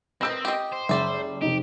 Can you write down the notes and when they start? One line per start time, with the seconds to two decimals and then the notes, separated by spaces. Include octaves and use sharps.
0.21 D#3 C4 B4 D#5 E6 G6 A#6
0.45 G4 D#5
0.72 C5
0.89 F#1 G3 D5 E5
1.42 F1 D#4 G4